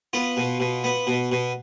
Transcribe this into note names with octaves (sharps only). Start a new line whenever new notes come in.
B3 F4
B2
B2
B3
B2
B2